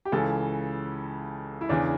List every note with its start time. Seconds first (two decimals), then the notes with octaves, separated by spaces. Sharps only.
0.05 G4
0.12 C#2 C#3 E3 A4
1.61 E4
1.69 E2 C#3 E3 D4